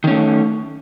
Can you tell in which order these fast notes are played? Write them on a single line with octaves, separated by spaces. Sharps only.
D#3 C#4 A3